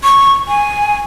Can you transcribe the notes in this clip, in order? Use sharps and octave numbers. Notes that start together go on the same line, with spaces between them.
C#6
G#5